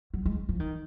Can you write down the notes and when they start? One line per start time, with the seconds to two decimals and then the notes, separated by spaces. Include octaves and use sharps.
0.14 F#3
0.26 G#3
0.49 F3
0.60 D#3